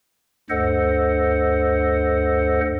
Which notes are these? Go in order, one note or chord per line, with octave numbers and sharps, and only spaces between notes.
D2 G2 A4 C5 D#5 F#5